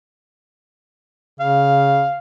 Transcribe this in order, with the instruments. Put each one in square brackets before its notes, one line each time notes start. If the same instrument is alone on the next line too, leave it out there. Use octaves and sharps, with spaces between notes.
[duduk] C#3 [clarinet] F5